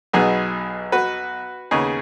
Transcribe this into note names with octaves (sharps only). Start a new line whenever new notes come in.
B1 B2 B3 D#4 G#4
F#4 B4
D#2 C#3 B3 D#4 G#4